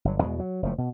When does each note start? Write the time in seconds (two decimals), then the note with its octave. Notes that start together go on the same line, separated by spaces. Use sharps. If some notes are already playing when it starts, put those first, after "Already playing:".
0.05 G1 F#3
0.20 E2 B2 G#3
0.40 F#3
0.62 F#1 F3 A3
0.78 B2